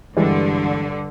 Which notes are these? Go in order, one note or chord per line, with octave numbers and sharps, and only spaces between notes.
G2 D3 E3 G3 G#3